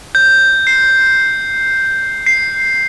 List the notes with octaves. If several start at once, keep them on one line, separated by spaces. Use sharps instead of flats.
G6
C7
C7